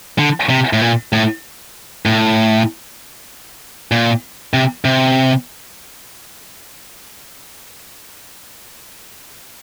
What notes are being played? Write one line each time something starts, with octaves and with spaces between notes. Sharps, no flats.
D3
C3
A2
A#2
A2
A2
A#2
C3
C3